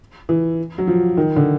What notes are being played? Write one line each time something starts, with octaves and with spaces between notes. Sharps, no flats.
E3
F#3
F3
D#3
D3